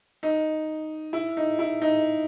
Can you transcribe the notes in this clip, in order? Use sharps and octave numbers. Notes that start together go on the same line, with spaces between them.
D#4
E4
D#4
E4
D#4